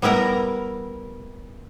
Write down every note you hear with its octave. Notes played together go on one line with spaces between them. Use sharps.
G3 B3 E4 A#4 A#5